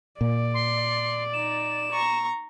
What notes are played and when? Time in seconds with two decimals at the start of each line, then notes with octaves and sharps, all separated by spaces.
0.21 A#2 D5
0.54 C6
1.33 D#4 E7
1.91 A#5 C#6